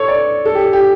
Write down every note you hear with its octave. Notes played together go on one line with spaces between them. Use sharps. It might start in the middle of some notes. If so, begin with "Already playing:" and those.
Already playing: A4 C#5
D5
A4
G4
G4